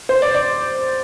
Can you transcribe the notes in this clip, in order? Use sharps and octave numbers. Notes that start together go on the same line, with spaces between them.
C5
D5
D5